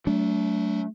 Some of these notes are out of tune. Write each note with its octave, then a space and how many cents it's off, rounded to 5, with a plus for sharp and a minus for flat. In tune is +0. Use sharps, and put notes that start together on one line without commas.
F#3 +30 A3 +0 D4 -30